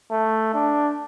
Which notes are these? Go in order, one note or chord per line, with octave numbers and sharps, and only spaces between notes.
A3
D4